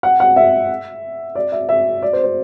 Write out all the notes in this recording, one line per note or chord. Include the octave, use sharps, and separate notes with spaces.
F#5
F#5
E5
D5
E5
E5
D5
C5
C5